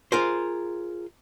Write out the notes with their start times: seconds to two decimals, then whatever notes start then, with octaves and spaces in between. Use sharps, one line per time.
0.12 F4 G#4 A#4 C5